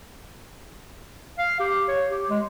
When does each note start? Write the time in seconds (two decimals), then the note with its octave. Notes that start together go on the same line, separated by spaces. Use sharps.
1.38 F5
1.60 G4
1.89 C#5
2.11 G4
2.29 G#3